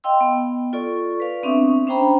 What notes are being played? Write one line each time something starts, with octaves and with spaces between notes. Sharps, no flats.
D#5 F5 G5 C6 E6
B3
F4 A4 D5 C#6
B4 F5
B3 C4 D4 E5 C#6 D#6
C#4 D4 C5 G5 A#5 B5